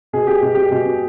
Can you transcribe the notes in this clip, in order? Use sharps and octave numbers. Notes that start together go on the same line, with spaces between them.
B2 G#4
G4
B2
G4
B2